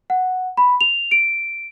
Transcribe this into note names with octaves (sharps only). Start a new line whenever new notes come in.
F#5
B5
F7
D7